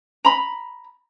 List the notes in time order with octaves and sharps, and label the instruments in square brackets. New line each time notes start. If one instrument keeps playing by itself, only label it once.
[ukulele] A#5 B5